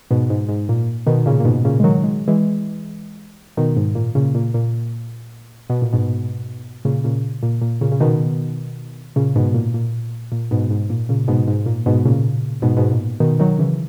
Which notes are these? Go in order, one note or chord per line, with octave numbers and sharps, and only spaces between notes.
G#2 B2
G#2
G#2
A#2
B2 D#3
A#2 C#3
A#2
G#2 B2
A#2 C#3
G#3
D#3 F#3
G#3
E3 G#3
B2 D#3
G#2
A#2
A#2 C#3
A#2
A#2
B2
A#2
G#2 B2
A#2 C#3
A#2 C#3
A#2
A#2
A#2 C#3
C#3
B2 D#3
A#2 C#3
G#2 B2
A#2
A#2
A#2
G#2 B2
G#2
A#2
A#2 C#3
G#2 B2
G#2
A#2
G#2 B2
A#2 C#3
G#2 B2
G#2 B2
A#2
B2 D#3
D#3 F#3
C#3 E3